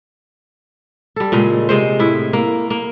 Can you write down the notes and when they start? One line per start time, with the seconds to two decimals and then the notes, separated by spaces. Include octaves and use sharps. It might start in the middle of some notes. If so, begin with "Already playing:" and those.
1.16 G3 A4
1.32 A#2 C#3 G#3
1.69 C3 G#3 C5
1.99 A2 E4
2.33 A#3
2.70 A#3